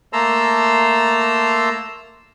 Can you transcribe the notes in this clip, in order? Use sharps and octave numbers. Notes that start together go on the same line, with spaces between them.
A3 A#3 A5 A#5 C6 E6